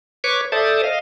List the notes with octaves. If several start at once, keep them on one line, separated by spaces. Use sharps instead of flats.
B4 C#5 C#6 D6
A4 C5 D5 E5 A5 D#6
D#5 F5